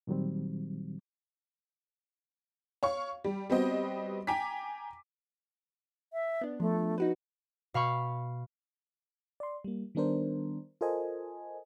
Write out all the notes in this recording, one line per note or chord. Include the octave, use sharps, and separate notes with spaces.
A#2 D#3 F#3 G3 C4
C#5 F5 C#6
G3
G3 B3 C4 F#4 C5 D#5
G5 G#5 A#5 D6 B6
E5
B3 D4
F3 A3
D#4 F#4 B4
B2 F5 B5 C#6
D5 C6
G3 A#3
D#3 G3 B3 D4 A#4 C5
F4 A4 A#4 C5 D#5 G#5